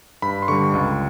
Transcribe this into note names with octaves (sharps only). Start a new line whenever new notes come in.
G2 B5
C6
D3 G3 C#6
C#2